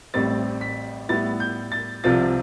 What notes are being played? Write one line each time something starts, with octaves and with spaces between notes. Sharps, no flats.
A1 A2 G3 C4 A6
B6
A2 G3 B3 E4 A6
G6
A6
C2 C3 F3 C4 F4 A6